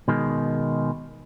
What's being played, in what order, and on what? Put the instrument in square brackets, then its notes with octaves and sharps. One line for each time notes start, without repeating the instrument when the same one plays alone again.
[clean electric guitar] B2 D#3 G#3